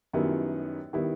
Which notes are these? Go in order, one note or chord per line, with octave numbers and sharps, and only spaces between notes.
F#2 D#3 G3 B3 E4
D#3 G3 B3 E4